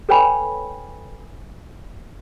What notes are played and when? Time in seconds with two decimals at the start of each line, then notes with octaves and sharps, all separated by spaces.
0.09 A4 B4 C#5 G5 G#5 B5